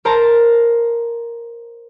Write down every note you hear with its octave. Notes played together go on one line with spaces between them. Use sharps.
A#4 C5 A5 A#5